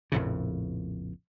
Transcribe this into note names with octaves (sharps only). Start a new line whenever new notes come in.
A#1 F2 A2 C#3